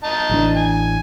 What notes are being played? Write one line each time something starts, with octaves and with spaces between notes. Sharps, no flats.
D#4 A5
A1 E3 D4
G#5